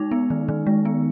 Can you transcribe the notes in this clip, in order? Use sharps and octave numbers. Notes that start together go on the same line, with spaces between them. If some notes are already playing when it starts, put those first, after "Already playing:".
Already playing: G#3 D#4
B3
D#3
D#3
G#3
B3